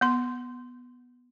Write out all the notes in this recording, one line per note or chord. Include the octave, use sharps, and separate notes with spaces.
B3 C6